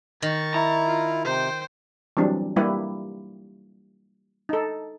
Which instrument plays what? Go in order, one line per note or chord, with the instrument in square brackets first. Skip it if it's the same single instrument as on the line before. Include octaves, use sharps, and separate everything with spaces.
[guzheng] D#3 [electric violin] C#6 A6
[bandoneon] E4 [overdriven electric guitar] A#5
[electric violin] F4
[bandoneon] C3 [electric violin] C5 G5
[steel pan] E3 F#3 G3 C4 D4
G3 A#3 E4 G4 B4
D#4 A4